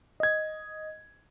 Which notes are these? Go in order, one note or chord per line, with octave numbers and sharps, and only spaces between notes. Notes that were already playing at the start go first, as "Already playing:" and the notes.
D#5 G#6